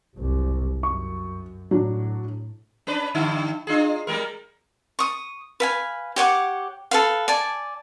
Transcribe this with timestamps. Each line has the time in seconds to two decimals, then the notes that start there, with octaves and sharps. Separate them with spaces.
0.15 F#1 C2
0.83 F#2 C#6
1.71 A2 F#3 D4
2.87 C#4 D4 B4
3.15 G2 D3 D#4
3.67 D4 F4 G#4
4.07 G3 G#3 A#4
4.99 C#6 D#6
5.60 B4 F5 G#5
6.16 G4 C#5 F#5 D6
6.91 A4 B4 F5
7.28 D5 G#5 A5